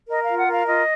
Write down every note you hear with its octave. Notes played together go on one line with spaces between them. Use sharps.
A#4 D#5
F4 F5
F#5
A#4
F5
F4 D#5